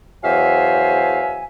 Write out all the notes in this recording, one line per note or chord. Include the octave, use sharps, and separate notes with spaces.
E2 F#3 C5 E5 F5 G#5